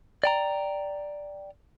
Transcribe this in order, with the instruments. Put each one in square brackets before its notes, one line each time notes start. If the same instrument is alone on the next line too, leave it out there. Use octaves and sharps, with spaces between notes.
[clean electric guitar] D5 G5 A#5